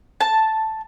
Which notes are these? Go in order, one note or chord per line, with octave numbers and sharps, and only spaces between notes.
A5